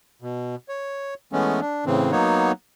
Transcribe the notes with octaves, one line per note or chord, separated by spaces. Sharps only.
B2
C#5
E3 G#3 A3 B3 C#4
D4
A2 C#3 E3 C4
F#3 A#3 B3 D#4 C#5